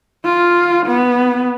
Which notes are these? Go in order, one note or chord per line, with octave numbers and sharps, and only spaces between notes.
F4
B3